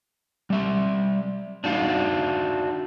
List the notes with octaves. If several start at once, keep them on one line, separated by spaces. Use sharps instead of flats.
G3 E5
D4 D#4 F#4 F5